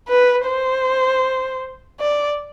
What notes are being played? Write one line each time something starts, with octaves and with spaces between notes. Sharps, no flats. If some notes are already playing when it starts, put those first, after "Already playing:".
B4
C5
D5